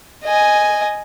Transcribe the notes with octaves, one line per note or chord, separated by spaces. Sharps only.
D#5 G#5